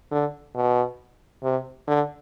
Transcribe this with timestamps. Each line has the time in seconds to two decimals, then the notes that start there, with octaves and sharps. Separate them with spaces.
0.11 D3
0.56 B2
1.44 C3
1.88 D3